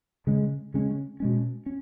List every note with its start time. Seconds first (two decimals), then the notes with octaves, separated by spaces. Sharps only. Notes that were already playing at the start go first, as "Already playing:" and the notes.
0.27 C#3 G#3 C#4
0.74 C#3 G#3 C#4
1.20 B2 G#3 C#4
1.66 C#4